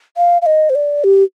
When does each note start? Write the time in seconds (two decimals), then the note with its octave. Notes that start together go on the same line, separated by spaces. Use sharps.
0.17 F5
0.42 F5
0.46 D#5
0.70 C5
0.75 D5
1.04 G4